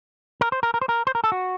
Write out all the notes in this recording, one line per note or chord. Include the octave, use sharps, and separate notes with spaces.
A#4
C5
A#4
A#4
C5
A#4
C5
A#4
A4
F#4